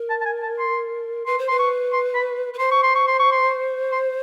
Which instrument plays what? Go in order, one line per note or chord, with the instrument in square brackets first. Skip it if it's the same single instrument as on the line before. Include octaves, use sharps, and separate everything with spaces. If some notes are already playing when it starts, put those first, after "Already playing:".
Already playing: [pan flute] A#4
[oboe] A5
A5
G#5
A5
C6
[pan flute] B4 [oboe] C6
[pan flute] C5
[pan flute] B4 [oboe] C6
[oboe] C#6
C6
B5
[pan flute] B4
[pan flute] C5 [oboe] C6
[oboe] C#6
C6
C#6
C6
C#6
C6
C6